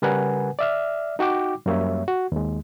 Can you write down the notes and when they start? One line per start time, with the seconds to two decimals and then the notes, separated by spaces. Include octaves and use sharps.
0.02 C#3 G3 A#4 B4 F#5 G#5
0.59 D5 E5 F6
1.19 D#4 F#4 G5 D6
1.66 F#2 G3 A#3 C#5 E5
2.08 F#4
2.32 D#2 G#3